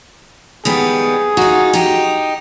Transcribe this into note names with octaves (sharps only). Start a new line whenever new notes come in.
D#3 G3 B3 G#4
D#4 F4 F#4
D#4 G4